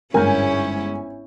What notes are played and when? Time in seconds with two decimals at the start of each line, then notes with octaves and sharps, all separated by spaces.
0.14 G1 G#2 C#4 E4 A#4 C#5 G#5 G6